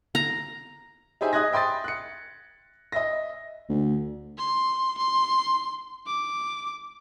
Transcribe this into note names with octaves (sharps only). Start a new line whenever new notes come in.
A#5
D#4 G4 G#4 C5 E5 G#5
D#5 D#6 F#6 G#6 A#6
E5 G5 C6 D#6 A6
F#6 C#7
D#5 E5 A#6
D2
C6
C6
D6